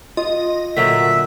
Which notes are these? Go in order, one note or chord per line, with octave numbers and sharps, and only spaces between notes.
F4 D#5
A#2 D3 F#3 E5 B6